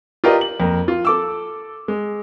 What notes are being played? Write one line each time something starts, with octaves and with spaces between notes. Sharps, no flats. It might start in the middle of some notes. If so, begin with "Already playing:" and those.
F4 G4 A#4 B4 D5 D#5
F#7
F2 A#3 A#4
F4
A4 D6 E6
G#3